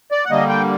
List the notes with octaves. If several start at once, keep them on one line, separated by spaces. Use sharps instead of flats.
D5
F#5
D3 G3 A#3 D#5
G5